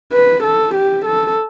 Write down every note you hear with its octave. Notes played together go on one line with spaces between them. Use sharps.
B4
A4
G4
A4